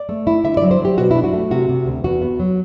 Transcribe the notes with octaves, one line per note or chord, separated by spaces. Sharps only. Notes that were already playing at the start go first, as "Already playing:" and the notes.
Already playing: D5
A3
E4
D3 E5
D5
F#3
C5
F#3 G4
B2 F#4
D4 E4
F#4
A3
C3 F#4
C3
D2
E2 F#4
B3
F#3